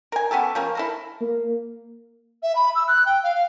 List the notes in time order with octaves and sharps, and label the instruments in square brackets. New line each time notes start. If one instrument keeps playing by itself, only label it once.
[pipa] A#4 G#5
B3 C#4 G4 A4
F3 A#3 C#4
E4 A4 A#4
[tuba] A#3
[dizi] E5
B5
E6
F#6
G5
F5
F5